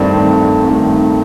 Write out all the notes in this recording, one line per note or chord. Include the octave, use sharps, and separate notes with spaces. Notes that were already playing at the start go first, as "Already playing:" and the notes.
Already playing: G2 D#3 A3 C4 D5
G2 D#3 A3 C4